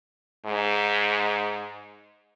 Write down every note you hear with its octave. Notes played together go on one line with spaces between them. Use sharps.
G#2